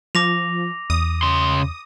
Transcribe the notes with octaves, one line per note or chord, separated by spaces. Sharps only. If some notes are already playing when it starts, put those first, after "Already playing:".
F3 D6 A#6 F7
E2 D#6
C#3 C6